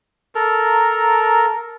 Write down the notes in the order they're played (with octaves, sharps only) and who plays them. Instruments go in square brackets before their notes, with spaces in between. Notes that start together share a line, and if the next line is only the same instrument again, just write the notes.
[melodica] A4 A#4 A#5